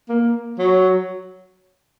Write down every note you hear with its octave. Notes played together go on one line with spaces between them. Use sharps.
A#3
F#3